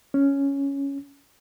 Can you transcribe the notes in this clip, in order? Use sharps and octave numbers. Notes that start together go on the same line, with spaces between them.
C#4